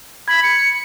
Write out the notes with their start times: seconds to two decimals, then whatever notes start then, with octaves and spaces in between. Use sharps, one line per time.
0.28 B5 G#6 B6
0.43 C#7